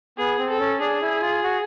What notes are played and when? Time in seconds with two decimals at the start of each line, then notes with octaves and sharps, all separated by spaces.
0.18 B3 G#4
0.39 C4
0.50 A4
0.60 C#4
0.80 D4 G#4
1.02 E4
1.22 F4
1.43 F#4